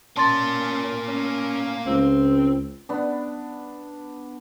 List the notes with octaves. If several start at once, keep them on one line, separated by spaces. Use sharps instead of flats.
A#3 C#4 D5 A5 C6 A6
C#4
C#2 C4
B3 D4